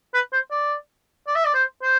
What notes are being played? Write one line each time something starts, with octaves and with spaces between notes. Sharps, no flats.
B4
C5
D5
D5
E5
D5
C5
C5